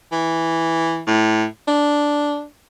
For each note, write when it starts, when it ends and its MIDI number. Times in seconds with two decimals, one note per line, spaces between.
0.12 1.02 52
1.07 1.45 45
1.68 2.43 62